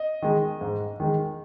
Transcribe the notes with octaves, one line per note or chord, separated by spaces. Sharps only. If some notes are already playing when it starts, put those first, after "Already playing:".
Already playing: D#5
D#3 G#3
G#2
D#3 G#3